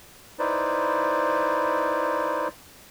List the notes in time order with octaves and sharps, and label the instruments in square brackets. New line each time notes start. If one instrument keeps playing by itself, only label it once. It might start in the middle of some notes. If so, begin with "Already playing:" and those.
[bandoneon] D#4 E4 B4 C5 D5